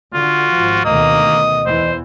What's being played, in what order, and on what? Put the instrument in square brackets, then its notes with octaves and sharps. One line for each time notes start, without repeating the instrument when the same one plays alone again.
[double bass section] D3 [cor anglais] F4 [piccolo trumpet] F#4
[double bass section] G#1 F3
[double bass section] D2 B2 D#3 [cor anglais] A#3 [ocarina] D#5 [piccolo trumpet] D#6
[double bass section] E2 E3 [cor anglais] C5